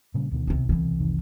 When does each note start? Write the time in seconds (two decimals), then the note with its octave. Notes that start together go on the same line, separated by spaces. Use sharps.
0.14 A#2 C#3 G3
0.31 D2 B2 D#3
0.47 C2 C3
0.69 C2 E3
1.00 F1 D#3